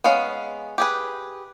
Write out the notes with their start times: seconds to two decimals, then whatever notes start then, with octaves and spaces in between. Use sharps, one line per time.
0.04 G#3 B3 C#4 F5
0.78 G4 G#4 B4